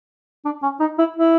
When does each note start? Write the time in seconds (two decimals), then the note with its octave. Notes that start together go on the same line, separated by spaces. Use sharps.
0.45 D4
0.62 C#4
0.80 D#4
0.98 E4
1.16 E4